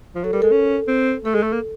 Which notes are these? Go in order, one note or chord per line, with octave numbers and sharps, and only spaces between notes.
F3
F#3 A4
G3 A#4
G#3 A4
C#4
C4
A3 A4
G#3
A3
A#3